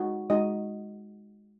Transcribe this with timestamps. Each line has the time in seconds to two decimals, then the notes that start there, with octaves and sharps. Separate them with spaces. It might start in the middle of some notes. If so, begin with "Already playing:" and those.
Already playing: G#3 D#4 F#4
0.30 G#3 D#4 F#4 D#5